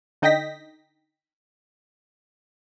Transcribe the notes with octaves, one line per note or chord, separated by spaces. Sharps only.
D3 D#4 D#5 G5 A#6 B6